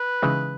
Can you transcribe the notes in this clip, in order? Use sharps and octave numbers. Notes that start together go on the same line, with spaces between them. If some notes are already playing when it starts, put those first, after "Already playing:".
Already playing: B4
C#3 E3 G#3 D#4